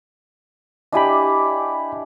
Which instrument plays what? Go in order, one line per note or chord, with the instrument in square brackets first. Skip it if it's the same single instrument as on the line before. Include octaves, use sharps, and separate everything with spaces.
[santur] D4 E4 G4 [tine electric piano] D#5 G#5 B5